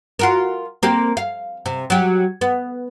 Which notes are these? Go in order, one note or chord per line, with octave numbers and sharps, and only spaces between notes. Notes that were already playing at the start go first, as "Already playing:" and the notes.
F4 F#4 A#4
A#3 C4 G4
F5
C3
F#3 G4
B3